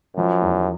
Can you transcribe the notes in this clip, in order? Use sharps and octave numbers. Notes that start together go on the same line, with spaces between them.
F#2 F3
E2